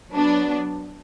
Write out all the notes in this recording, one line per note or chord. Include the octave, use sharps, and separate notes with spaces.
F#3 B3 D4